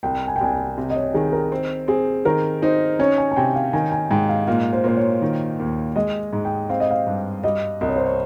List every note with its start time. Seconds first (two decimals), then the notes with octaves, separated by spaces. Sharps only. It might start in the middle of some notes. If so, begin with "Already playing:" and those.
0.03 C2 G5
0.28 G#5
0.36 G5
0.41 C2 G#5
0.53 G5
0.77 C3
0.90 D#5
0.96 C#5
1.14 D#3 G#4
1.32 A#4
1.52 C4
1.88 C4 G#4
2.25 D#3 A#4
2.62 D#4 C5
2.99 C#4 C#5
3.18 G#5
3.31 G#5
3.36 C3 G5
3.55 F5
3.73 D#3 G#5
3.92 G#5
4.11 G#2 G5
4.29 F5
4.48 A#2 F5
4.73 C5
4.84 A#2 C5
4.97 C#5
5.22 D#3
5.59 D#2
5.96 G#3 D#5
6.33 G#2
6.45 G5
6.69 C4 F5
6.80 D#5
6.91 F5
7.07 G2
7.44 G3 D#5
7.81 C2 D#5
7.89 C#5
7.96 C5
8.04 C#5